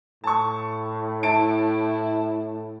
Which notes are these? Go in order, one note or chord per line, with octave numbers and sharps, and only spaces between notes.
A2 A5 C#6
E4 A5 D7